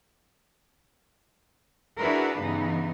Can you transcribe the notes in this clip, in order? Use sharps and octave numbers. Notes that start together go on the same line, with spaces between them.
D4 E4 F#4 G#4 A#4 B4
G2 C#3 E3 B3 D#4